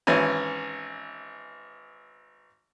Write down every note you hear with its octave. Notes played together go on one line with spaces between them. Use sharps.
G#1 E3 C#4 G#5